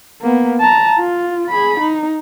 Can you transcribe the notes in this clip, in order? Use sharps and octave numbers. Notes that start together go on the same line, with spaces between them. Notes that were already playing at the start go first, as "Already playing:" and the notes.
A#3 B3
A5 A#5
F4
G#4 B5
D#4